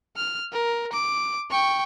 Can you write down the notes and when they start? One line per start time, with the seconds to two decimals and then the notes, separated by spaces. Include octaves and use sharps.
0.16 F6
0.52 A#4
0.93 D6
1.50 G5 C#6